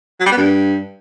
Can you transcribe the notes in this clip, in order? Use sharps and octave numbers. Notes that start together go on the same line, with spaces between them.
F#3
G3
B3
G2